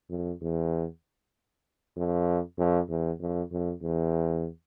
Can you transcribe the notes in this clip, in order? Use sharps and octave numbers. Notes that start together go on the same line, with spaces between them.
F2
E2
F2
F2
E2
F2
F2
E2